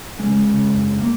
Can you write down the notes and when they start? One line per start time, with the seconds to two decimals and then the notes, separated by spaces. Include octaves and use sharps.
0.19 C#3 G#3
0.46 C#3
0.73 F#2
1.00 A#3